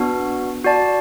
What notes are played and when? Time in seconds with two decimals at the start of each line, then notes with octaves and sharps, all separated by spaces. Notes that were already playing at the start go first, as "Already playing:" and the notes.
Already playing: B3 D4 F#4
0.65 F#4 D5 A5